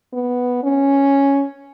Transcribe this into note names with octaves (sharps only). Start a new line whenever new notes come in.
B3
C#4